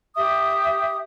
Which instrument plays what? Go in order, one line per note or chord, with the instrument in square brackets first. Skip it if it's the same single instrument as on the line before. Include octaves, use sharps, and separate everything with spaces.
[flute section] G4 E5 D#6